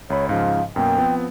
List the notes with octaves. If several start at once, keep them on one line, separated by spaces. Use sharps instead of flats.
C#2 C#5 B5
G#2 C#3 F3 F5
F#2 B2 A#3 G5
F3 B3 C4